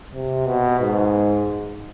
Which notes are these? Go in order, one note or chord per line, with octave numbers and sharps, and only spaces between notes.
C3
B2
G#2